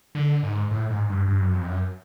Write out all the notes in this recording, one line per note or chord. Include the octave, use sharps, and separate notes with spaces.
D3
G#2
A2
G#2
G2
G2
F#2
F2
F#2